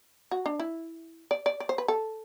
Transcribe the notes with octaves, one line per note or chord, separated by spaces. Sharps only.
F#4
D4
E4
D5
D5
D5
C5
B4
A4